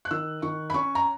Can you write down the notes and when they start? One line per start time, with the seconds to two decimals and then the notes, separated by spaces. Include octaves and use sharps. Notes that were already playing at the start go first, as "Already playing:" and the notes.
0.05 F#6
0.11 D#3 E6
0.42 D#3 C#6
0.70 B5
0.74 C#4 C#6
0.95 A#5